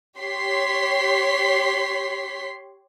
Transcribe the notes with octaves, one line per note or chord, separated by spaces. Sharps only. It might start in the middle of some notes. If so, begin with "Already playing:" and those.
G4 C#5 C6 B6 C7